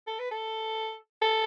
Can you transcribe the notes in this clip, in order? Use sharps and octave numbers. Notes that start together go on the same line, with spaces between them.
A4
B4
A4
A4